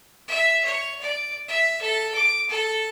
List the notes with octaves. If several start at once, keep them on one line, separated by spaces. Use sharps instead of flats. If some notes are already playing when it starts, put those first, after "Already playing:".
E5
C#5
D5
E5
A4
D6
A4